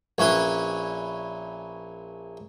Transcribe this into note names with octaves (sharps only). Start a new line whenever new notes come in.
A#1 C#4 E4 B4 C6